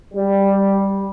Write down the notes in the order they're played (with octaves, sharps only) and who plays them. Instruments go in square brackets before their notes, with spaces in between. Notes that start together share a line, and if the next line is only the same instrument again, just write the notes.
[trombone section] G3